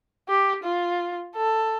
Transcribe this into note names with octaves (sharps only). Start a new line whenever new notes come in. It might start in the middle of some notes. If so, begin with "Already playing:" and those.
G4
F4
A4